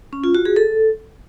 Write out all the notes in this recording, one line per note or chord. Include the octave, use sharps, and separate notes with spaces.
C#4
F4
F#4
G#4
A4